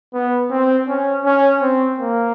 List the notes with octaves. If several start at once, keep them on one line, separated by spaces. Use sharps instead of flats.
B3
C4
C#4
C#4
C4
A#3